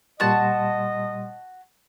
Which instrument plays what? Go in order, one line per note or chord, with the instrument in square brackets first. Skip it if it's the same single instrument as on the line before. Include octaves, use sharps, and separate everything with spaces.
[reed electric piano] A#2 G3 C6 [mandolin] F#4 A5 [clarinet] D#5